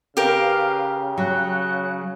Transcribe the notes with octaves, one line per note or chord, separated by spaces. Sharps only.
C#3 G4 A#4 B4 F5 F6
F#3 F#5 F#6